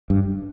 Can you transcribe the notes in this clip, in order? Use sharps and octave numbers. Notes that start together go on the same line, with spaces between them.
G2